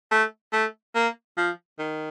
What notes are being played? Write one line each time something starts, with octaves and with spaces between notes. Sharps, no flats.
A3
A3
A#3
F3
D#3